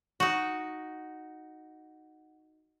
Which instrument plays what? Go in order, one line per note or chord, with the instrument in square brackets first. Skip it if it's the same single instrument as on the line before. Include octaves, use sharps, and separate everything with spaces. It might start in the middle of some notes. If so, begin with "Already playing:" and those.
[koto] D#4 F#4